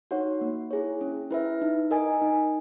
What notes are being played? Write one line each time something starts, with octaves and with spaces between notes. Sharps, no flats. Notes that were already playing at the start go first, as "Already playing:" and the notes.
D#4 F#4 C#5 F#5
A#3
E4 G#4 C#5
C#4
E4 B4 E5
D#4
A#4 D#5 G#5
D#4